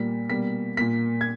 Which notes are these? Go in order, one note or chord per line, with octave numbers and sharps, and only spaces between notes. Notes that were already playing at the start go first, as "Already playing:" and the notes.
Already playing: A#2 G3 A#3 B6
B2 G3 A#3 B6
A#2 A#3 B6
G#6